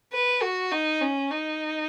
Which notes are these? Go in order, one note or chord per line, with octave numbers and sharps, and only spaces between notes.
B4
F#4
D#4
C#4
D#4